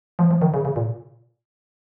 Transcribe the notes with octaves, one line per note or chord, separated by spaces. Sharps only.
F3
F3
D#3
C#3
C#3
A#2